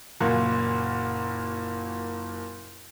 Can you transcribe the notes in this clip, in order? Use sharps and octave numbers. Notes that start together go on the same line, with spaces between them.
F#1 A#2 A#3 F#4